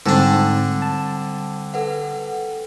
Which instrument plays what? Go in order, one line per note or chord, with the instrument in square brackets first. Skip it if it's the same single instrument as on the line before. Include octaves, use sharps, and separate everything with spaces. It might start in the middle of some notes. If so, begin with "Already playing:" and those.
[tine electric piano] G#2 A5 [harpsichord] D3 D4 [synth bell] G3 [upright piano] C4
[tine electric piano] A5
[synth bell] A4 B4 F#5